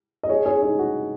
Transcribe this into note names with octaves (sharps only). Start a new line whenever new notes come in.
D#5
G#4 C#5
G#4 C#5
D#4 G#4
F#4